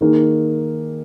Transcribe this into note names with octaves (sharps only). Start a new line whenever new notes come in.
D#3 A#3 D#4 G#4